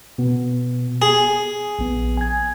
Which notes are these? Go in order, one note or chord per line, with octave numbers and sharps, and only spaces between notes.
B2 B3
G#4 G#5
A#1 B3
G#5 G#6